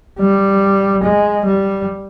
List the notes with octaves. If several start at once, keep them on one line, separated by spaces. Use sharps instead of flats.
G3
G#3
G3